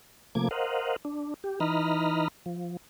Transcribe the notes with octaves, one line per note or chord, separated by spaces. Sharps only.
C3 F3 A3 A#3 D6 G#6
A#4 C5 D#5 F5 F#5
D4
G4
E3 D#4 D#5 A#5 B5 F6
F3